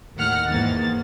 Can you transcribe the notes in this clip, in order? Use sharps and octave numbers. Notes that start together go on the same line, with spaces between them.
D#2 A2 D#3 F#5 F6
E2 G#2 D#3 A#3 A6